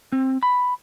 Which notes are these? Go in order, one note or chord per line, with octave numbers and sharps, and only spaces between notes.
C4
B5